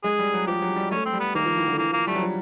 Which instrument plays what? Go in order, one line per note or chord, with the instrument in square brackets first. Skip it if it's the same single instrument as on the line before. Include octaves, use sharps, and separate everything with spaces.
[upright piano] G#3 [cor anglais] G#4
[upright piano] G3
F#3
[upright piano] F3 [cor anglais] G4
[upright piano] F#3
G3
[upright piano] A3 [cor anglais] C#4
[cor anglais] C4
[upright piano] G3
[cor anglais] B3
[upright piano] D#3 [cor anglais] A#3
[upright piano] F3
E3
D3
[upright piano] E3 [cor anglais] A#3
[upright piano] F3 [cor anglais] A#3
[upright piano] G3 [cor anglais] A3
[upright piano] F#3
F3